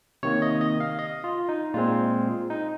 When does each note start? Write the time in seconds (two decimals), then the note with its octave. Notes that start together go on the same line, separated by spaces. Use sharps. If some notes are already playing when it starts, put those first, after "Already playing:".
0.23 C3 D#3 A#3 C#5
0.42 D#5
0.61 D#5
0.80 F5
0.99 D#5
1.24 F4
1.49 D#4
1.74 A#2 G#3 C4 F4
2.50 D#4